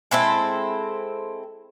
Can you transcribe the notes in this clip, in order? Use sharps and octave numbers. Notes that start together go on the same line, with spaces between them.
G#3 C4 E4 A4